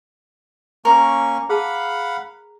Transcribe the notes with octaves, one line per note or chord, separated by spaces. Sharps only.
A#3 C#4 A#4 C#6
G#4 F5 F#5 A5 B5